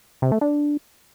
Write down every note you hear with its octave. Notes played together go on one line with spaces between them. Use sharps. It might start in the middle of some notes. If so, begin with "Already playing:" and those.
C3
A3
D4